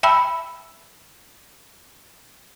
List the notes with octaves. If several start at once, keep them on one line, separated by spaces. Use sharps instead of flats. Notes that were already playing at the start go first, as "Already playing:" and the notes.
E5 G5 A5 B5 E6